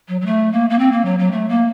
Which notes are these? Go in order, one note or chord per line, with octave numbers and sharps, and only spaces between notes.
F#3
F#3
A3
A#3
A#3
C4
A#3
F#3
F#3
A3
A#3